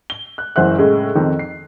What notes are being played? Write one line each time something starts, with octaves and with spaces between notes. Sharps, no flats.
G7
F#6
F#1 E3 C5 E5 F#5 F#6
A2 C#3 G#3
F2 D#3 C4
C7